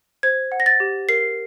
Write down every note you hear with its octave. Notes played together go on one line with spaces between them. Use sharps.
C5 G#6
F#5
A#6
A6
G4
A#4 C7